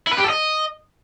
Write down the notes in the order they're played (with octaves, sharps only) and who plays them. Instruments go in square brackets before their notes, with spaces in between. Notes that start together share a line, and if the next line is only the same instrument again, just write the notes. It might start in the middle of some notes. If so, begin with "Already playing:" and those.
[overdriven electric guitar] E4
B4
G4
A4
D#5